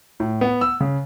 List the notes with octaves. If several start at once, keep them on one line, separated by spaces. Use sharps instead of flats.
A2
B3
E6
C#3